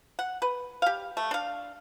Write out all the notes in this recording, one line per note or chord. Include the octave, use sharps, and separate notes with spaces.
F#5
B4
G4 F5
A3
D4 F5